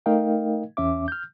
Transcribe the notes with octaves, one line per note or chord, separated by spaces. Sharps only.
A3 D#4 A#4 D#5 F5 G5
E2 C#4 E5 D6
F6 G6